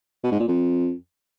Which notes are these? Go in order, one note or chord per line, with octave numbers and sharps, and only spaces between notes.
B2
G#2
A#2
F2